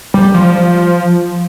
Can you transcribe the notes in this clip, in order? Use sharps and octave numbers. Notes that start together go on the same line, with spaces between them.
G3
F3